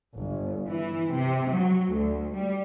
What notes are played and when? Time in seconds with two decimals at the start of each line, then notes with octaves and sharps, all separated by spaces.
0.18 G1
0.67 E3
1.13 C3
1.50 F#3
1.91 D2
2.33 G3